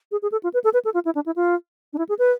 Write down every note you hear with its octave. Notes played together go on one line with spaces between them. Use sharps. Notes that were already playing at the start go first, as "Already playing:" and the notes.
G#4
G#4
A4
F4
B4
A4
B4
A4
F4
E4
D4
E4
F4
D4
E4
G#4
B4